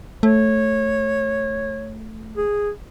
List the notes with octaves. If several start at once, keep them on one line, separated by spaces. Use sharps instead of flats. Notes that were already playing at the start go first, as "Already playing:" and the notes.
A3 C#5
G#4